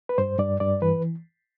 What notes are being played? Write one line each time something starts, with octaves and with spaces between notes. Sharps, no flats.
B4
G2 C5
G2 D5
G2 D5
E3 B4